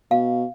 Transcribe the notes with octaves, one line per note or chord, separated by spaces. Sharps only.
B2 F5